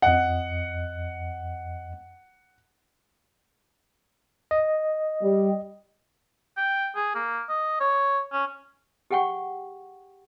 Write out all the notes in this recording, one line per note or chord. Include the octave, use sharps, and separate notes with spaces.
F2 D#5 F#5
D#5
G3
G5
G#4
A#3
D#5
C#5
C#4
G4 G#4 F#5 G5 C#6